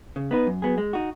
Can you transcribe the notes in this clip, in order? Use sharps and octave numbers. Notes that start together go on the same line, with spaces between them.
C#3
B3 D#4 B4
F#2
F#3 B3 G#4
G#3
D#4 F#4